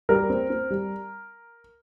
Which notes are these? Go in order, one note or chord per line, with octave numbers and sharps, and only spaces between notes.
G3 A#4
C4
C4
G3